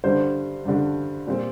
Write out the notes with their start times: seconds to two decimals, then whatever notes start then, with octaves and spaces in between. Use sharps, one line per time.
0.04 G2 D3 G3 C5
0.65 G2 D3 G3
1.27 A#2 G3 C4